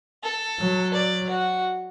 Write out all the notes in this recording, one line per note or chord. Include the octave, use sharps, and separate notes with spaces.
A4
F#3
D5
F#4